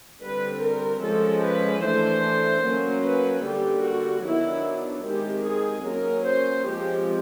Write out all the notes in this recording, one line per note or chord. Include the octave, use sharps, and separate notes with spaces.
D3 G3 C4 B4
A#4
F3 G#3 C#4 A4
B4
E3 A3 D4 C5
F#3 A#3 C#4
B4
D3 G3 A#3 G4
F#4
D#3 F#3 B3 D4 E4
D#3 G#3 C4 G4
G#4
F#3 A#3 C#4 A#4
C5
F3 G#3 C4 G4